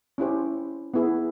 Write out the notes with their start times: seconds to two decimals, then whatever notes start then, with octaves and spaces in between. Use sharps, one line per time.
0.18 C#4 E4 G4 C5
0.94 B3 E4 G#4